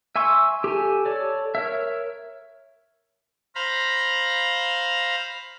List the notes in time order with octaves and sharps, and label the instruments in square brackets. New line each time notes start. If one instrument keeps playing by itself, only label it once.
[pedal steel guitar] E5 G#5 C6 C#6 E6
G4 A4 G#5
A4 C#5 D5
A#4 C#5 E5
[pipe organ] C5 F5 A#5 B5